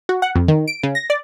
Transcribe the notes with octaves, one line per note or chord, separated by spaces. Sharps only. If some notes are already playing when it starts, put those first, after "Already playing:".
F#4
F#5
F2
D#3
D7
C#3
A#6
D5